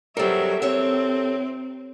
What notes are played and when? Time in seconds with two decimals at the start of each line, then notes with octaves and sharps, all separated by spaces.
0.17 F#3 G3 C4 G4 A4 A#4 E5
0.62 E2 C4 C#5 E5